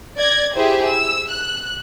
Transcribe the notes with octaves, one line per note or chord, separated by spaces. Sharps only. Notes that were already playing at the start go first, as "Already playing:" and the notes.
D5 G#6 A#6
E4 G4 G#4 C5 E5
E6
F#6